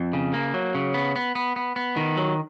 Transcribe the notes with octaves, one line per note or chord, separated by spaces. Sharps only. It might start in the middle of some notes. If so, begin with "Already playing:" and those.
Already playing: F2
C#3
A#3
F#3
C#3
B3
B3
B3
B3
B3
D#3
F#3